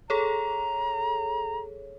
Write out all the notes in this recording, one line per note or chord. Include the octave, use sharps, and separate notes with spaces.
G#4 A4 C#5 A#5